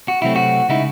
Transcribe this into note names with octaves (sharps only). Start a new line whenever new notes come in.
F#4
C3 F#3 A3 C4 E4
F#4
C#3 G#3 D#4 E4